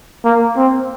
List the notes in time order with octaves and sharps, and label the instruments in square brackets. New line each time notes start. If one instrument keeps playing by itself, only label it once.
[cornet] A#3
C4